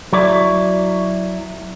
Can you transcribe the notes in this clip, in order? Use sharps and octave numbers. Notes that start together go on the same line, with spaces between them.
F#3 E4 D5